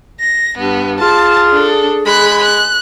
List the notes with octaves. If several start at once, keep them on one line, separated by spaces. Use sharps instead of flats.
A#6
G2 B3
F4 G#4 A5
D4 A4
G#3 B5 F#6
F#6